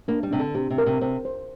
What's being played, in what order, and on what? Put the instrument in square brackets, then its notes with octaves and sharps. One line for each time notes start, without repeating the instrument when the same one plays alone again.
[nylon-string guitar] A#3 [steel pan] D4
[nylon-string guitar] G3
[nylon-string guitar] C3 [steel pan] D4
[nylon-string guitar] D3
[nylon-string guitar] C3 [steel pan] G4
[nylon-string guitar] C3
[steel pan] A#4
[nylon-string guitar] C3
[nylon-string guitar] C3 [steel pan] C5
[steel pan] C5